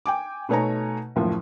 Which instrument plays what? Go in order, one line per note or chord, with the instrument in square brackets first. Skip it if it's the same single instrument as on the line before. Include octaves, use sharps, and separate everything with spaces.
[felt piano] G5 G#5 D6
B2 A3 D#4 C#5 G#5 A#5
F#1 D#2 A2 F3